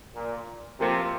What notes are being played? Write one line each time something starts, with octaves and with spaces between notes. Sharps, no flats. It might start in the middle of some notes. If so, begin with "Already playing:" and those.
A#2
C3 F3 A#3 F4